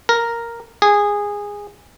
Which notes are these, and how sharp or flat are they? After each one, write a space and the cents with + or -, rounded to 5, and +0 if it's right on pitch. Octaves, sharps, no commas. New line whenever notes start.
A#4 +0
G#4 -15